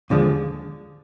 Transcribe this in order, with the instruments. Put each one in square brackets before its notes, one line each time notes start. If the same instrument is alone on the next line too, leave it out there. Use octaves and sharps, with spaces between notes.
[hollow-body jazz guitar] D#2 D3 F3 G#3